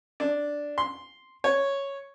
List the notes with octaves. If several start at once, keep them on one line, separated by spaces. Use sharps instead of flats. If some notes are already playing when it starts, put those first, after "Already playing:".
D4
C6
C#5